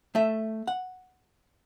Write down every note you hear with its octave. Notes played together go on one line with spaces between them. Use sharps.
A3 E5
F#5